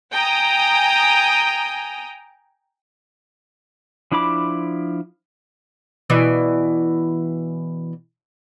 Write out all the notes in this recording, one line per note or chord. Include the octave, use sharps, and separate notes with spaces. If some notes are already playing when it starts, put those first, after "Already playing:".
G5 G#5 A#5 D#6
F3 D4 E4 B5 D6
B2 E3 D5